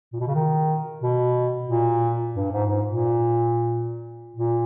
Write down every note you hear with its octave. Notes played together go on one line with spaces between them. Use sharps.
A#2
B2
C#3
D#3
B2
A#2
G2
G#2
G#2
A#2
A#2